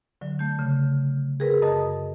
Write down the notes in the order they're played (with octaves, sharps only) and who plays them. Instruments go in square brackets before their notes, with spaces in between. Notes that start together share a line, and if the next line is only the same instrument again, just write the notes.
[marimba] D3 F#3
A3 G6
C#3
G#4 A#4 B4
F#2 D#5 A5 D#6